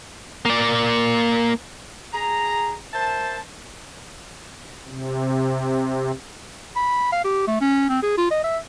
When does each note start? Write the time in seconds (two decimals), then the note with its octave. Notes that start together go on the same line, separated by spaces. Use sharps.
0.45 A#3 D5
2.13 G#4 A#5
2.94 A#4 C5 E5 A5
4.87 C3
6.76 B5
7.12 F5
7.24 G4
7.47 A3
7.61 C#4
7.89 C4
8.02 G#4
8.18 F4
8.31 D#5
8.44 E5